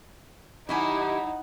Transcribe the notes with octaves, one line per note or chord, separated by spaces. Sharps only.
D#3 F#3 D#4 E4 G4 G#5